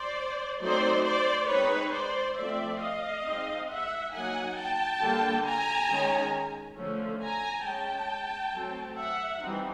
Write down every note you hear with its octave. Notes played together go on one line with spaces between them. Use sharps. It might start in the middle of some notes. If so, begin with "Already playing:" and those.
Already playing: C5 D5
F#3 A3 C4 D#4 C5 D5
C5 D5
G#3 C4 D#4 B4 C#5
C5 D5
F3 A3 C4 D5 E5
D#5 F5
G#3 C4 D#4
E5 F#5
F#3 A#3 D#4 F#5 G#5
G5 A5
D3 G3 A#3
G#5 A#5
D#3 G#3 C#4
D3 F3 A3 C#4
G#5 A#5
G#3 C#4 G5 A5
F#3 A3 C4
E5 F#5
E3 G3 C4 D#4